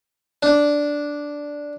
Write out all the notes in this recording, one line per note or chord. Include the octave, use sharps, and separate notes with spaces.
D4